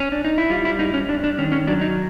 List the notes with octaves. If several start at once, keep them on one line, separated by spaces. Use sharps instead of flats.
C#4
D4
D#4
E4
G3 F4
E4
G2 D#4
C#4
G2 D4
D4
D#3 C#4
C#4
F#3 D4
D#4